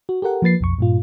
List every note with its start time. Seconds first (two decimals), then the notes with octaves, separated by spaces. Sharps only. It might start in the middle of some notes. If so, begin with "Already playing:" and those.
0.09 F#4
0.22 G4 A4 A#4 F#5
0.42 F3 A#3 B4 A6 C7
0.61 B1 F2 C#6
0.79 G2 A#2 F4